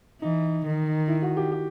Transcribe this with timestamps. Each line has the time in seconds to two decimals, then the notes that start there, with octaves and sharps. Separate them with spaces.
0.21 E3 D#4
0.65 D#3
1.08 E4
1.22 F#4
1.37 G4
1.52 G4